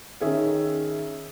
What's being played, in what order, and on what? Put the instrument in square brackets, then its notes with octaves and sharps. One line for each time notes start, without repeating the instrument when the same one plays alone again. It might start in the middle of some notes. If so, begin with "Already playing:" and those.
[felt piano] D#3 C#4 G#4 E5